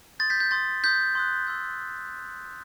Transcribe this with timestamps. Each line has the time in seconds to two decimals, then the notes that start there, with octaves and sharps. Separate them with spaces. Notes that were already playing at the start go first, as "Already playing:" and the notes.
0.19 C6 D#6 G6 A6
0.30 G6 B6
0.40 G6
0.51 C6 D#6 G6 A6
0.83 C6 D#6 F#6 G6 B6
1.15 C6 D#6 F#6
1.47 C6 E6 G6